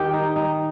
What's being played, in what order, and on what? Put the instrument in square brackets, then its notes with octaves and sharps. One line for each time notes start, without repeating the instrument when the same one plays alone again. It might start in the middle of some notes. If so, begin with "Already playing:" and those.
Already playing: [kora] D#3 G4 G5
D#4
D#4